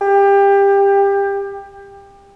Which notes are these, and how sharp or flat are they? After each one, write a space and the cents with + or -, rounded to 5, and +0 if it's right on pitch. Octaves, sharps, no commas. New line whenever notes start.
G4 +25